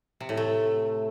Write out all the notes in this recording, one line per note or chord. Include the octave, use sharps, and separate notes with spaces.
C3
A2
A3